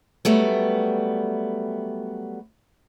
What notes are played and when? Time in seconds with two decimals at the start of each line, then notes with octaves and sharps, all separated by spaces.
0.25 F#3 G3 A3 B3